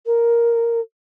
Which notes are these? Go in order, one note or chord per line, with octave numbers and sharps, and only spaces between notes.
A#4